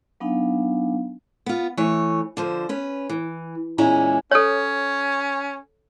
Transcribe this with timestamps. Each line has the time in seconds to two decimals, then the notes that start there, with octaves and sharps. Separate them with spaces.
0.20 F#3 B3 D4 D#4 F5 G#5
1.46 B3 F4
1.77 E3 A3 C#5
2.37 D3 F3 C5
2.69 C#4 B4
3.09 E3
3.78 E2 A#2 G#3 C#4 E4 A#5
4.31 C#4 A4 C#5